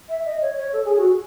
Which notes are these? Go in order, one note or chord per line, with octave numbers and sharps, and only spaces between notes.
E5
D#5
C#5
C#5
A4
G#4
F#4